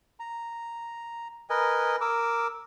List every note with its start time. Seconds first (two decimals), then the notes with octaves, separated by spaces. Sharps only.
0.20 A#5
1.50 A#4 B4 D#5 G#5
2.01 A#4 D6 E6